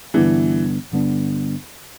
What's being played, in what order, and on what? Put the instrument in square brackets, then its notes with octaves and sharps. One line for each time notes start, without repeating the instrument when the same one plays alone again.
[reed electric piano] G2 D3 G3 B3 D4 [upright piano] E3
[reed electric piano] G2 D3 G3 B3 D4